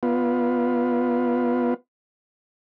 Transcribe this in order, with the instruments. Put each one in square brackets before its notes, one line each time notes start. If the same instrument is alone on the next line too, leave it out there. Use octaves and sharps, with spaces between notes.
[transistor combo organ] B3 F4